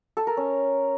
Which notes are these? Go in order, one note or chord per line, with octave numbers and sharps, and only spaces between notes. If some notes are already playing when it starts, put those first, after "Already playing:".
A4
A#4
C#4